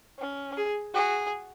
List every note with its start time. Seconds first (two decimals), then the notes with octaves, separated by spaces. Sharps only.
0.19 C#4
0.57 G#4
0.94 F#4 G#4